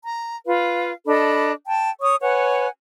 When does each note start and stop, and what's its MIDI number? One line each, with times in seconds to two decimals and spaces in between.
0.05 0.36 82
0.46 0.92 65
0.46 0.92 71
0.46 0.92 77
1.06 1.52 62
1.06 1.52 69
1.06 1.52 75
1.06 1.52 83
1.67 1.90 79
1.67 1.90 81
2.00 2.15 73
2.00 2.15 85
2.00 2.15 87
2.21 2.68 71
2.21 2.68 73
2.21 2.68 78
2.21 2.68 80